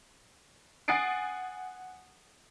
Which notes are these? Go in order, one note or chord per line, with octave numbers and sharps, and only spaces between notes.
F#5 G#5 D#6 A6 C7 D7